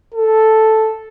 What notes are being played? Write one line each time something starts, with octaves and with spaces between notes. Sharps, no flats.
A4